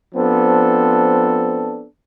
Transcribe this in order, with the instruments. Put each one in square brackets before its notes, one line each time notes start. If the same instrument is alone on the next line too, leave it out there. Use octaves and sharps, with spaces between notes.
[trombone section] F3 B3 C4 D4 A4